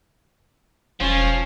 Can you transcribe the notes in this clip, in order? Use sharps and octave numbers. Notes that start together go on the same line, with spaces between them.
E1 F3 C#4